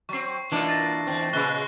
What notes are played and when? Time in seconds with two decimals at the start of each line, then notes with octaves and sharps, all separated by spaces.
0.09 F#3 C4 C#6 C7
0.52 E3 A#3 D4 D#4 F4
0.68 A6 A#6
1.07 E2 G2 C4
1.33 A#2 C#3 G#3 C#6 F#6 G7